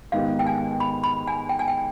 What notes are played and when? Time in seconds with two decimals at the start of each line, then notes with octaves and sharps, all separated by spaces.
0.12 G#2 D#3 B3 D#4 G4 F5
0.39 G5
0.47 G#5
0.80 B5
1.04 B5
1.28 G#5
1.49 G5
1.59 G#5
1.68 G5